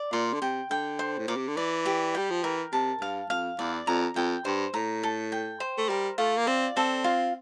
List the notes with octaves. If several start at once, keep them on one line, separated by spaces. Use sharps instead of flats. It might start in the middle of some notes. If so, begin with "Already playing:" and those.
Already playing: D5
A#2 C6
D3
C3 G5
D3 G5
C5
A2
A#2 D6
C3
D3
E3 D5
G4
G3 G5
F3
E3 A#4
C3 A5
G2 F5
F2 F5
E2 D5
F2 A#5
F2 G5
G2 C5
A2 A#5
A4
G5
C5
A3
G3 A#4
A3 F4
A#3
C4 D5
C4 A4
F4